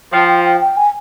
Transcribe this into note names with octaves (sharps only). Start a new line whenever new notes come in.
F3 G5
G5
G5
G5
G#5